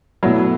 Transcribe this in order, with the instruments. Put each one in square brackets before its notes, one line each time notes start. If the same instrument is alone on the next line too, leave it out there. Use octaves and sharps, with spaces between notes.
[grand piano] B2 A3 E4 [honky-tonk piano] F#3